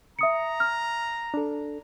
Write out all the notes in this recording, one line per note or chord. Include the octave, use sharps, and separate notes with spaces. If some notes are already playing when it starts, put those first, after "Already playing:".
E5 A#5 D#6 C#7
F6
D4 A4